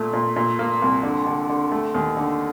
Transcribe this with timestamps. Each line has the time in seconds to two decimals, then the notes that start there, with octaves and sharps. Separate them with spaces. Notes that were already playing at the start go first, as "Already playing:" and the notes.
Already playing: A#2 A3
0.13 A#2
0.36 A#2
0.59 A#3
0.82 C2
1.03 D3
1.26 D3
1.49 D3
1.72 A3
1.94 D#2
2.17 D3